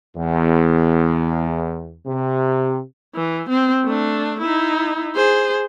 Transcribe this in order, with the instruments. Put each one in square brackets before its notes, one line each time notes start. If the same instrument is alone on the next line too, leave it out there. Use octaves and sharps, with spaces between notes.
[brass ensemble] E2
C3
[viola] E3
C4
A3 D4
D#4 E4
G#4 C5